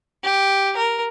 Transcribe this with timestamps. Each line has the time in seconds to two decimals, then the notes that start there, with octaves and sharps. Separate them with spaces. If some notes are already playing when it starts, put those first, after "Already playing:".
0.23 G4
0.76 A#4